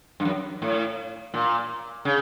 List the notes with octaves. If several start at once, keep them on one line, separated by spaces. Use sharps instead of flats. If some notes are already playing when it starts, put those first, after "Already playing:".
G2
F#2
A2
A#2
C#3